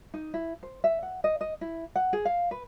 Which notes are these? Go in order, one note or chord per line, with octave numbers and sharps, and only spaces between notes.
D#4
E4
C5
E5
F#5
D#5
D#5
E4
F#5
G#4
F5
B4